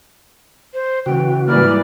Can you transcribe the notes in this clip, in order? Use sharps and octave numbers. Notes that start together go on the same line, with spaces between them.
C5
C#3 E3 F#4 G5
G#2 E3 G3 A#3 B4 D5 F6